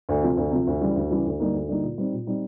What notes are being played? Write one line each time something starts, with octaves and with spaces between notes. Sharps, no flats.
D2
C3 F3
D2
C3 F3
D2
C#3 E3 G3
D2
C#3 E3 G3
D2
D3 G3 A#3 D#4
D2
D3 G3 A#3 D#4
A#2
G3 C4 D#4
A#2
G3 C4 D#4